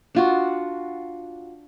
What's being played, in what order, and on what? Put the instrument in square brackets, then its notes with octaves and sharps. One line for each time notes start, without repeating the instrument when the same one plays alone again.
[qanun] D4 F4 F#4